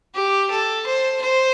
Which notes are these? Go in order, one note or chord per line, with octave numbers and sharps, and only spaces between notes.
G4
A4
C5
C5